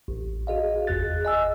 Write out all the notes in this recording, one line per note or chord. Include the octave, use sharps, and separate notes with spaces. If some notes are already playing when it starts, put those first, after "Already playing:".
A1
F#4 G#4 D#5 F5
G1 E2 G#4 F#6 A6
D#5 G#5 E6